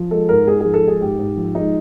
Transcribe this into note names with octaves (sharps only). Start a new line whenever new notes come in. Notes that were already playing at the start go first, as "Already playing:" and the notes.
Already playing: F3
G#3 A4
G#2 A#4
G#2 G#4
F3 G#4
A4
G#3 G#4
G#2 G4
G#2
F3
G#3 D#4